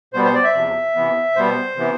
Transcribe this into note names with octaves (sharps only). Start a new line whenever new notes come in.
B2 G3 B3 C5
C5
D5
E5
E2 C3 F3
C3 E3 B3
B2 G3 B3 C5
C3 E3 B3